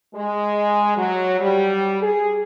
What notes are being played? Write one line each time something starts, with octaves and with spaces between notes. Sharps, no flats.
G#3
F#3
G3
G#4